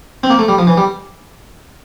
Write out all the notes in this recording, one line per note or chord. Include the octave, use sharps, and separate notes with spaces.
C4
A#3
A3
G3
F3
E3
G3